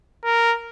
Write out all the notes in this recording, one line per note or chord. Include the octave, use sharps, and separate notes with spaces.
A#4